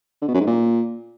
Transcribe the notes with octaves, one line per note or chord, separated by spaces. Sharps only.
D3
B2
F#2
G#2
A#2